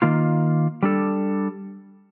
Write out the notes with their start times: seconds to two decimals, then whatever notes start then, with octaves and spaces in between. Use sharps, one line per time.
0.02 D#3 A#3 F4
0.83 G3 D4 A4